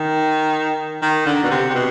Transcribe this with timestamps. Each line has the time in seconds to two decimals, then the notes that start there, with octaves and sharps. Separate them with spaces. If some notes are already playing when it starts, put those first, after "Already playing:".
Already playing: D#3
1.02 D#3
1.26 D3
1.43 B2
1.51 C3
1.70 C3
1.74 B2